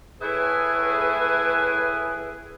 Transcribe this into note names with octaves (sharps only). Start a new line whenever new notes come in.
A2 E4 G#4 B4 G#5